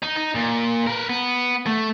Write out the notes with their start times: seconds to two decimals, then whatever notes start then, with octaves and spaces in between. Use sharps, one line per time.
0.02 D#4
0.16 D#4
0.35 A#2
0.87 A#4 B4
1.10 B3
1.67 A3